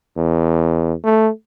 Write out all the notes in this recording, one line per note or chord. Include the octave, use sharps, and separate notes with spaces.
E2
A3